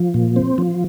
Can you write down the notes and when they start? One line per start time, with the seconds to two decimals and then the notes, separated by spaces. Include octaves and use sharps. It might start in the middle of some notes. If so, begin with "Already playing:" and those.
Already playing: F3
0.14 A#2
0.36 C4
0.58 F3